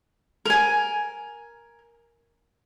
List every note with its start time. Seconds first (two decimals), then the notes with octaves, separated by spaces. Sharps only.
0.45 A#4 G#5